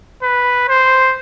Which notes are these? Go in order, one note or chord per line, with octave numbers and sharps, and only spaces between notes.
B4
C5